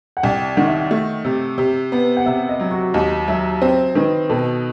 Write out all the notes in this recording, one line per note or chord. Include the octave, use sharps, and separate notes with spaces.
F#5
C2 G5
D#3 F#5
E5
F#5
A3 E5
C3
C3
B3
F#5
C3 E5
D#5
F#3
F#4
D#2 D#5
F#3 E5
C4 C5
D#3 B4
B2 A4